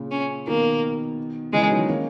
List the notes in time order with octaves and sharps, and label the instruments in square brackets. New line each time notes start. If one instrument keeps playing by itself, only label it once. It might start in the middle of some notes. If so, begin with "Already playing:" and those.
Already playing: [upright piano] A#2 C#3
[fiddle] C#4
[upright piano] B2 D#3 [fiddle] A#3
[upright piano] C#3 E3 [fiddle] G#3
[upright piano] D#3 F#3
A#3 C#4